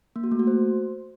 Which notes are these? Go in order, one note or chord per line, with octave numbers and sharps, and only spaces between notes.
A#3
F#4
A3
F#4
C5